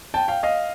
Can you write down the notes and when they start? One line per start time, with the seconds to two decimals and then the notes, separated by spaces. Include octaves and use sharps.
0.14 G5 A5
0.28 F5 G5
0.43 D#5 F5